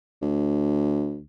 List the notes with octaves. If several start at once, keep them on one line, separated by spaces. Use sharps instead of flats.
D2